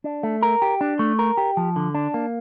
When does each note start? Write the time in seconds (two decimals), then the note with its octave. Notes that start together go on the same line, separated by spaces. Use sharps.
0.04 D4
0.23 A3
0.42 A#4
0.62 G4
0.81 D4
0.99 A3
1.19 A#4
1.37 G4
1.57 F3
1.76 D3
1.95 D4
2.14 A#3